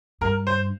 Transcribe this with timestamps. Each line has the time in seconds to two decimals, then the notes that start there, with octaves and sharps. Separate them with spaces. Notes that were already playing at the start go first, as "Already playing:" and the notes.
0.21 G2 A#4
0.47 C5